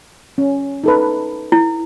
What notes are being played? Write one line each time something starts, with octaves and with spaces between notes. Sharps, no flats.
C#4
D#4 A4 B4
E4